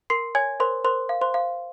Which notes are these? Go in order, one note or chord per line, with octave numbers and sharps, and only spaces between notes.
A#4 C6 C7
C#5 G#5 G#6
A#4 C5 C6
A#4 C5 C6
F5
C5 C6
F5